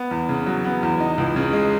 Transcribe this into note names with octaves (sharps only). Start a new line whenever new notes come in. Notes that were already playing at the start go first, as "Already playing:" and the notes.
Already playing: B3
E2
C#3
F#3
B3
E2
D#4
C#2
C#3
G#3